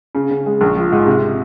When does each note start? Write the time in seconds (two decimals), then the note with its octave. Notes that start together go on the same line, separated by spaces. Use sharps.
0.15 C#3
0.30 C#3
0.46 G#3
0.61 A#1
0.77 F3
0.92 G#2
1.07 C3